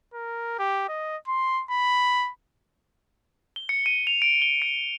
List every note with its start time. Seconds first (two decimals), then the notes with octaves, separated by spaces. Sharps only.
0.14 A#4
0.59 G4
0.88 D#5
1.28 C6
1.71 B5
3.56 G7
3.69 C#7
3.86 D#7
4.07 F7
4.22 D7
4.42 G7
4.62 C#7